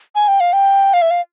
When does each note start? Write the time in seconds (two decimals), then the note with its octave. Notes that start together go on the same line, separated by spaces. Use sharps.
0.15 G#5
0.28 G5
0.40 F5
0.53 G5
0.94 F5
1.02 E5
1.11 F5